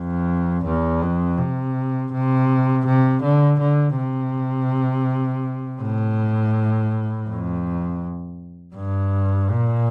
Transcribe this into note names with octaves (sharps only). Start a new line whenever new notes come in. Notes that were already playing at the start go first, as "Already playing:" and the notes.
Already playing: F2
E2
F2
C3
C3
C3
D3
D3
C3
A2
F2
G2
A#2